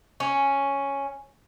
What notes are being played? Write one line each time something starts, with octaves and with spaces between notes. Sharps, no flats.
C#4